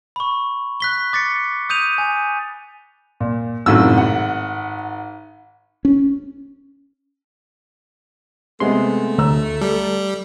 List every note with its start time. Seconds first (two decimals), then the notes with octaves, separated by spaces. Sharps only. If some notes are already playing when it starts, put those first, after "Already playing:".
0.16 B5 C#6
0.80 F#6 B6 G7
1.13 D6 A6 B6 C#7
1.70 D#6 G6 D#7 F7
1.98 G#5
3.20 A#2
3.66 G#1 F#2 A2 C3 E6
3.98 F#5
5.85 C#4
8.60 C3 G#3 A3 B3 C6
9.18 D2 A#5 E6
9.61 G3 A4